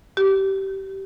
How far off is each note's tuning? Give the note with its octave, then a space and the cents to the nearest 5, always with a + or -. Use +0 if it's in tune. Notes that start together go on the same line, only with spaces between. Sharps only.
G4 -20